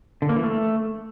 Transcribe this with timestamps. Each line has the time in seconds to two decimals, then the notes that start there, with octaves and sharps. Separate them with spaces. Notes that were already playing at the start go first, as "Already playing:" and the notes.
0.22 D3
0.29 A#3
0.36 E3
0.44 A3